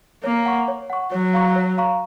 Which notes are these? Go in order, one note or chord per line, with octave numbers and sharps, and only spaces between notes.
A#3 C#5
F#5 C#6
C#5
F#5 C#6
F#3 C#5
F5 A#5 C#6
C#5
F5 A#5 C#6